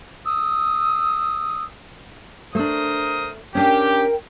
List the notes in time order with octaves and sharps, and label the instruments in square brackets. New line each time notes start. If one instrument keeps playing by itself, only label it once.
[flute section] D#6 E6
[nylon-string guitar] A3 D4 [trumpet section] A#4 C5 D#6
[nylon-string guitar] C#4 D4 [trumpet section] G4 [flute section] A#4 G5